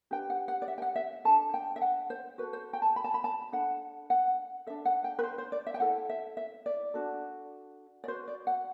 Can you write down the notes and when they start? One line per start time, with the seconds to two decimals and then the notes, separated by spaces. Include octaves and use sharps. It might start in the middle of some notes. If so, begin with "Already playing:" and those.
0.11 D4 G4 B4 G5
0.30 F#5
0.48 F#5
0.62 D5
0.68 E5
0.78 G5
0.82 F#5
0.96 E5
1.25 D4 A4 A5
1.54 G5
1.76 E5
1.82 F#5
2.10 C5
2.38 F#4 B4
2.42 A4
2.53 C5
2.73 G5
2.82 A5
2.96 B5
3.04 A5
3.14 B5
3.24 A5
3.52 D4 A4 F#5
4.10 F#5
4.67 A4 E5
4.70 D4
4.85 F#5
5.04 G5
5.19 B4
5.23 C5
5.38 C5
5.52 D5
5.67 E5
5.74 G5
5.80 E4 A4 F#5
6.09 E5
6.37 E5
6.66 D5
6.94 D4 F#4 A4
8.04 D5
8.08 F#4 B4 C5
8.28 D5
8.47 F#5